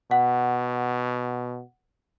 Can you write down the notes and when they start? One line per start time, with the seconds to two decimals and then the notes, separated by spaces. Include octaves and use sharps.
0.11 B2 F#5